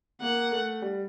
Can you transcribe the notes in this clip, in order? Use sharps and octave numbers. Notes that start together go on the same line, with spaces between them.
A#3 F#5
A3
G3